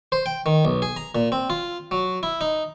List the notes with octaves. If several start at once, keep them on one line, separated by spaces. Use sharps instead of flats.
C5
G5
D#3
B1
G#4
A#5
A#2
C4
F4
F#3
E4
D#4